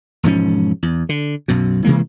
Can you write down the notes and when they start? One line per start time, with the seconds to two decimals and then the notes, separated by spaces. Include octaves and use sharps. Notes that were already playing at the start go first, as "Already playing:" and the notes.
0.23 E1 G#2 F3 C#4
0.83 E2
1.09 D3
1.48 B1 F#2 B2
1.85 C3 E3 G#3 A#3